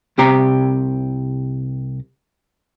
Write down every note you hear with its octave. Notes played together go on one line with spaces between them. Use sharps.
C2 C3 G4 A#5